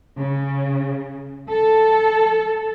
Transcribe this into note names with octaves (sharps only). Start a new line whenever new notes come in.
C#3
A4